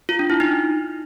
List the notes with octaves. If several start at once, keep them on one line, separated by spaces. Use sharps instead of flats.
F4
D4
E4
D#4